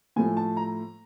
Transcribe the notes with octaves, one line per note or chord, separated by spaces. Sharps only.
A2 F3 A3 G#5
A5
A#5